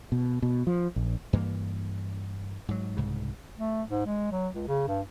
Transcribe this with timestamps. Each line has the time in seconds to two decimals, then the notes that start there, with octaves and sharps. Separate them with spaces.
0.12 B2
0.42 B2
0.67 F3
0.96 A#1
1.33 G2 E3 A#3
2.68 G#2 F#3
2.97 C2 G#2 C#3
3.58 A3
3.88 G#2
4.06 G#3
4.31 F#3
4.54 C#2
4.68 C#3
4.88 G2